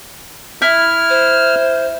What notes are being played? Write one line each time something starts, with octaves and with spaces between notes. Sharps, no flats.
E4 F6
C5